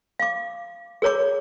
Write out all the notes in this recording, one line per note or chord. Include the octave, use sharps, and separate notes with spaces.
F5 D6
G#4 A#4 C#5 A#5 D6